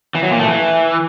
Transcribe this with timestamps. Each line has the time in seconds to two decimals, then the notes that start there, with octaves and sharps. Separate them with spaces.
0.15 E3
0.23 F#3
0.31 A#2
0.39 A3
0.47 E3